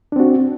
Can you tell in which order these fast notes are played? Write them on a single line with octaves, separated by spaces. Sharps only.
D4 C4 F#4